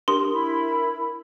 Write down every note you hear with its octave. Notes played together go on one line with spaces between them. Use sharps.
D4 G4 A#4 C6
E4 B5